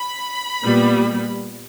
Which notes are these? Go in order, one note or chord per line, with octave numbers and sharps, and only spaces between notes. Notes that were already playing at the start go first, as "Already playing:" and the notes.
Already playing: B5
A#2 G3 B3